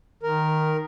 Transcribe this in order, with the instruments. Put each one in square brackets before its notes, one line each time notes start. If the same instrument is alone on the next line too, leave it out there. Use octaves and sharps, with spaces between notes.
[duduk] D#3 [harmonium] A#4